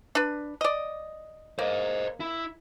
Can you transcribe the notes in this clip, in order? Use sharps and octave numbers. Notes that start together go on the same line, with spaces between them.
D4 B4
D5 D#5
A#3 C5 D#5
E4